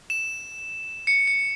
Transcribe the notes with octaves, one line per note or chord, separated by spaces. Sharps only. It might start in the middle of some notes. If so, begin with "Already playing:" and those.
E7
C#7
C#7